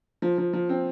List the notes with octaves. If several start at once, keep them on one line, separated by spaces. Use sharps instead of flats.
F3
F3
F3
C4